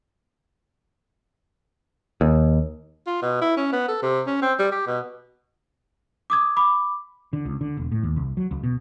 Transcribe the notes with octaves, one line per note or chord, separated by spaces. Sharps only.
D#2
F4
B2
E4
C#4
B3
A4
C3
C#4
C4
G3
G4
B2
D6 D#6 G#6
B5 D6
D3
C#2
D3
E1
A2
D#2
C2
F#3
C#2
B2